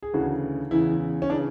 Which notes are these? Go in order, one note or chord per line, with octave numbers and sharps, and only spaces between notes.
G#4
D2 C#3 E3 F#4
E2 C#3 E3 E4
C#4
C#3 E3 D4